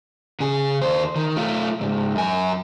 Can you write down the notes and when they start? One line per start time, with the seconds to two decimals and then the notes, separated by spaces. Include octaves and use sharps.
0.40 C#3 G#4
0.82 D#2 C5
1.16 D#3
1.36 A3 F4
1.81 C#2 G#2
2.15 F#2 G#5